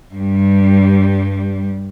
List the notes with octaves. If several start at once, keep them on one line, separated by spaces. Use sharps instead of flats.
G2 G3